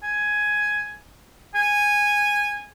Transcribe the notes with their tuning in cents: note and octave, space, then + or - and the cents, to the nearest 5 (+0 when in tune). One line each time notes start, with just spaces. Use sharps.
G#5 +10
G#5 -10